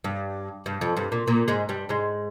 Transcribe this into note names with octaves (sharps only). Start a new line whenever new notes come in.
G2
G2
F2
G2
A#2
A#2
G#2 G#3
G2 G3
G#2 G#3